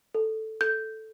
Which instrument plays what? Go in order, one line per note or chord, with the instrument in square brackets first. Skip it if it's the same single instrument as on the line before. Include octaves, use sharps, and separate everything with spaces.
[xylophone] A4
A4 G6